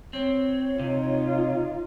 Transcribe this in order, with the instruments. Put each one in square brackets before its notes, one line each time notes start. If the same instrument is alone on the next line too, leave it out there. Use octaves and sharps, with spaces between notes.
[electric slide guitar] C4 [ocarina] C#5
[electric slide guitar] C3 [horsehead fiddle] D#4 F4